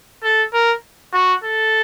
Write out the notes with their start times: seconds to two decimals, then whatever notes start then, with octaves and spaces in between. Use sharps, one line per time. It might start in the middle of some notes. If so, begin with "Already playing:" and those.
0.23 A4
0.53 A#4
1.13 F#4
1.44 A4